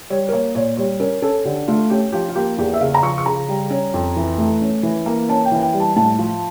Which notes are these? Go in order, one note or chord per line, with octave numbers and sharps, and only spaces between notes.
G3 C#5
A#4
A#3 C#5
A#2 C#5
G3 C#5
C#4 A#4
C#4 A4
D3 G4
A3 F4
C#4 G4
F3 G4
F4
A#3 G4
E2 G4
E5
C#3 F5
A#5
F3 C#6
C#6
C#3 A#5
G3
C#4
F2
E3
A3
C#4
E3
A#3
C#4 A5
G5
E3
G5
G3
A5
A2 A5
F3